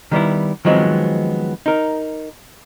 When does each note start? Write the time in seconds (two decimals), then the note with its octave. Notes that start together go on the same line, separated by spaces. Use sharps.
0.11 D#3 G3 B3 E4
0.65 D#3 F3 F#3 G#3 B3 C4
1.66 D#4 A#4